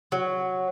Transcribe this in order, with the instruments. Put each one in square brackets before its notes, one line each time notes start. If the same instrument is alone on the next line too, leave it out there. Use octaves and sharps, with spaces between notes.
[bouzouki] F#3